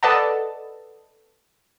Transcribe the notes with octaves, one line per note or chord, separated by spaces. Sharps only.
A4 B4 D5 D#5 F#5 A5